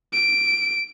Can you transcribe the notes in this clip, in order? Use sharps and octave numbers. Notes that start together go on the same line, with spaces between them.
D7